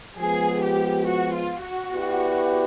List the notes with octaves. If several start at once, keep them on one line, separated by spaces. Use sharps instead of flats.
F3 G#3 B3 G#4
G4
F#4
F4
F#4
B3 E4 G4 B4 D5